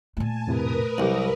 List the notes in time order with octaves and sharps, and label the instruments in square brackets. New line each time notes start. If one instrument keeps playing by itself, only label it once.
[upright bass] A#2 A3 [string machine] G#5 A5
[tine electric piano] F2 A2 C3 [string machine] A#4 B4 D#6
[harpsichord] C2 [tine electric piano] F#3 G3 G4